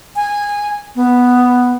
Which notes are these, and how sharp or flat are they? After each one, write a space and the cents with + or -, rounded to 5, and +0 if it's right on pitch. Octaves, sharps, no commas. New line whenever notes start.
G#5 -15
B3 +0